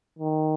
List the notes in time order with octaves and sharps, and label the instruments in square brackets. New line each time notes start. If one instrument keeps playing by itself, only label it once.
[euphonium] D#3